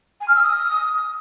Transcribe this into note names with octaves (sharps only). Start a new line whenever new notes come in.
G#5
F6
E6
D#6